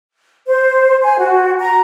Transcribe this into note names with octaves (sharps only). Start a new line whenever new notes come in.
C5
G#5
F#4
A#5